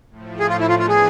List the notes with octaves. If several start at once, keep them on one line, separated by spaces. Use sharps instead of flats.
A2 F3 A3
G#4
F4
E4
E3 B3 D4 F4
F4
G#4